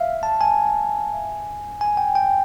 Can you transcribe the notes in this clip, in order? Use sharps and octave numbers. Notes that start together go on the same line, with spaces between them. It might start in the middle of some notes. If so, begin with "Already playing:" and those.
Already playing: E5 F5
A5
G#5
G#5
G5
G5